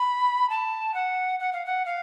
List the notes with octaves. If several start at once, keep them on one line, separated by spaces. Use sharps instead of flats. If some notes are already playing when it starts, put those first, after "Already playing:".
Already playing: B5
A5
F#5
F#5
F5
F#5
F5